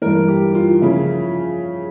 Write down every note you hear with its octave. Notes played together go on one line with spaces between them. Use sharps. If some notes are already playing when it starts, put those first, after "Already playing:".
G2 E3 A#4
G4
F4
C#3 F3 E4